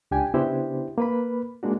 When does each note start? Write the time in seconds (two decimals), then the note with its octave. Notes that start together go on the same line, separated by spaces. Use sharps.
0.11 C#2 D4 G4 G5 G#5
0.34 C#3 B3 D4 E4 G4 C5
0.98 A#3 B4 B5
1.63 G#3 A#3 D4 F#4